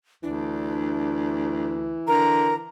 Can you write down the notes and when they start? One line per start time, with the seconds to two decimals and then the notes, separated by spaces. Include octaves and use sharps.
0.23 D2 E3 D4
2.08 D3 A#4 A#5